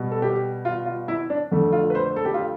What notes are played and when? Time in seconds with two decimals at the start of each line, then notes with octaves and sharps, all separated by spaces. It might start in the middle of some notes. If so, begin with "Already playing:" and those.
Already playing: B2 G3
0.12 A4
0.22 G4
0.65 F4
0.86 F4
1.08 E4
1.30 D4
1.51 F2 D3 A3
1.72 F4
1.90 B4
1.95 C5
2.16 A4
2.25 G4
2.34 F4